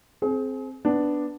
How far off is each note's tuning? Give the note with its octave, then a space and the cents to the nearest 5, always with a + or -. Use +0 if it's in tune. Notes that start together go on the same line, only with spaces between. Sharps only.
C4 +0 G#4 +35
B3 +0 D4 +0